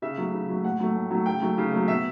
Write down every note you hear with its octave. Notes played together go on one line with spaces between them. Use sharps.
C#3 E5
F#3 A3
C#3
F#3 A3
A2 F#5
F#3 A3
A2
F#3 A3
C#3 G5
F#3 A3
C#3
F#3 A3
B2 E5